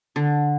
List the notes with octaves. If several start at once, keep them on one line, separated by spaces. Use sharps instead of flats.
D3